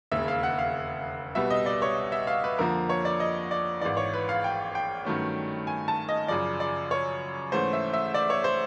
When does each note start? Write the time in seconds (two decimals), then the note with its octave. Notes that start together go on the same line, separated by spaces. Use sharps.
0.11 E1 D#2 C#3 E5
0.28 F5
0.43 F#5
0.59 F5
1.35 C2 B2 G3 B3 E5
1.50 D#5
1.66 D5
1.82 C#5
2.12 E5
2.27 F5
2.44 B4
2.59 F2 D3 F3 A#3 A#4
2.89 C#5
3.05 D5
3.20 D#5
3.51 D5
3.81 G#1 G#2 E3 D5
3.97 C#5
4.14 B4
4.29 F5
4.44 G5
4.75 G5
5.05 G2 D#3 F#3 A3 C#4
5.67 G#5
5.88 A5
6.09 D#5
6.28 F#2 C#3 F3 D5
6.60 D5
6.91 C#5
7.52 G#2 E3 A3 C#4 C5
7.73 E5
7.94 E5
8.14 D5
8.30 C#5
8.44 C5